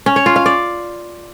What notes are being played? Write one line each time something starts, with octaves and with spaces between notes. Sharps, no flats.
C#4
C#5
F4
F5
D5